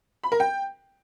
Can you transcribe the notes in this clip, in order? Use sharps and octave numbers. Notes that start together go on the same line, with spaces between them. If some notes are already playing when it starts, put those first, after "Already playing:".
B5
A#4
G5